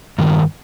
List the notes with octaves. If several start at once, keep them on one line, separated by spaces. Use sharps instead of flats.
G2 D#3